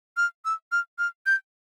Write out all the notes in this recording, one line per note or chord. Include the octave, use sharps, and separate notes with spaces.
F6
E6
F6
F6
G6